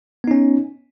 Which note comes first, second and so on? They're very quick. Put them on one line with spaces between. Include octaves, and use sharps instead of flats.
B3 D#4 C#4